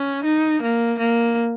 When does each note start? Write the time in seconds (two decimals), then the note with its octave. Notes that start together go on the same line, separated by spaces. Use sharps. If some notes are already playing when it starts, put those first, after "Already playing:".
Already playing: C#4
0.24 D#4
0.62 A#3
0.99 A#3